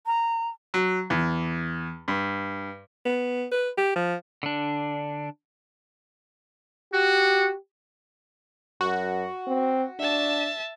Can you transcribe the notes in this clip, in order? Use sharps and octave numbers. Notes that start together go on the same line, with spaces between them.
A#5
F#3
E2
G2
B3
B4
G4
F3
D3 D4
F#4 G4
F#2 F#4
C4
D4 E5 A5